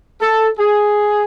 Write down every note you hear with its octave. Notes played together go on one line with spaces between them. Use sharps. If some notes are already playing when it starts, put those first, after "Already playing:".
A4
G#4